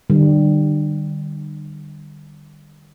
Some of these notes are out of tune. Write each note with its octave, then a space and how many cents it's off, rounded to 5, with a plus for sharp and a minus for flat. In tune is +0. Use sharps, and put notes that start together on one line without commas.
D3 +45 G3 +0